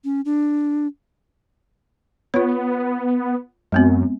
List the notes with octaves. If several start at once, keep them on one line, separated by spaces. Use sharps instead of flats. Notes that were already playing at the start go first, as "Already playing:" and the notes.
C#4
D4
B3 F4 C#5
F#2 G#3 B3 C4